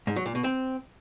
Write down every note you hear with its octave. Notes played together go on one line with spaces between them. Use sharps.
G#2
F#3
A#2
B2
C4